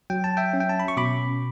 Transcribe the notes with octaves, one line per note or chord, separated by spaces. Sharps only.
F#3 G5
A5
E5 G5
C#4
G5
A5
B5
C#6
B2 B5 D6